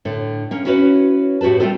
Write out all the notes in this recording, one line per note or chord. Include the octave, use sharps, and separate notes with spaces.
A2 D3
A#3 C#4
C#4 E4 F#4 G#4 B4 C#5
A2 F#4 G4 B4 A5
G3 A3 C4 F4 B4 C5